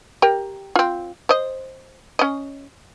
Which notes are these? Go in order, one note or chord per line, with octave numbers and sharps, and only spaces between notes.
G4 A#4 G5
C4 F4
C5 D#5
C#4 D#5